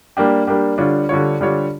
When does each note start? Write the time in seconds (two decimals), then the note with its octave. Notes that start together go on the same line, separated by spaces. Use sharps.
0.17 G3 A#3 D4 G4
0.47 G3 A#3 D4 G4
0.78 D3 G3 D4 F4 C#5
1.09 D3 G3 D4 F4 C#5
1.41 D3 G3 D4 F4 C#5